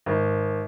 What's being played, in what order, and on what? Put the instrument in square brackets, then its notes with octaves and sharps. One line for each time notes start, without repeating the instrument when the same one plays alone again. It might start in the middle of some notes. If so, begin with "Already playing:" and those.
[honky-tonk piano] G#1